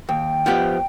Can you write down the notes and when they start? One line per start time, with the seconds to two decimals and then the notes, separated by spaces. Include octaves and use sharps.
0.09 D#2 G5
0.46 F3 B3 G4